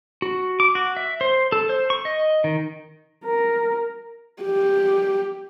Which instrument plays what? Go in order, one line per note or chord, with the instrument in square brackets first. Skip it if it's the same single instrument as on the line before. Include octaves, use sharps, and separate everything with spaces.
[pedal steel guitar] F#4
D6
F#4
E5
C5
A4
C5
C#6
D#5
D#3
[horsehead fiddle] A#4
G4